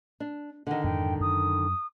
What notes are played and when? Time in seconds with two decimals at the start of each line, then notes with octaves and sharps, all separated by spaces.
0.20 D4
0.67 D3 D#3 F#5
0.84 F2 G#2 G5
1.20 F#2 D#6